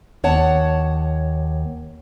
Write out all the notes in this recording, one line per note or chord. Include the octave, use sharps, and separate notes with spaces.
D#2 C#5 F#5 A5